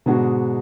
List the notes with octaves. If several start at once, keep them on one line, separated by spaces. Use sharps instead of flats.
G#2 B2 D3 G#3 B3 D4 F#4